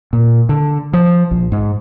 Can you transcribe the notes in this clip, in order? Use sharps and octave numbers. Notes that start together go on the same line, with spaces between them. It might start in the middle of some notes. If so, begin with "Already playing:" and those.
A#2
D3
F3
A#1
G#2